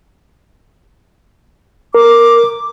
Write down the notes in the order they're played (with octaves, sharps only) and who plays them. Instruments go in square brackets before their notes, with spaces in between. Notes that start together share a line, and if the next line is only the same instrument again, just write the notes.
[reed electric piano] A#4 [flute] D6